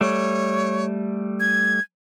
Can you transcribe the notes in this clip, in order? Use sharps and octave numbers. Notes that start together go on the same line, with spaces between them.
G3 A3 C#5
G#6